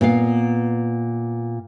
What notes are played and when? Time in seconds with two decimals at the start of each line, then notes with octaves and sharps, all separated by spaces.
0.01 A#2 B3 F5